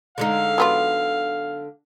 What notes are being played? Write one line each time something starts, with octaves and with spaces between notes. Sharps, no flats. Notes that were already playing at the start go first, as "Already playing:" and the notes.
D3 G#3 D#4 F5
F#3 B3 F4